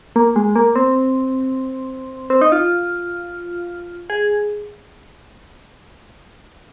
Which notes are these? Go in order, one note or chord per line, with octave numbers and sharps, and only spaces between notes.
A#3
G#3
A#3
C4
C4
D#4
F4
G#4